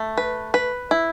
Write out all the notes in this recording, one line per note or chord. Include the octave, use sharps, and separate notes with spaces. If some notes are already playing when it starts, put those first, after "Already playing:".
Already playing: A3
B4
B4
E4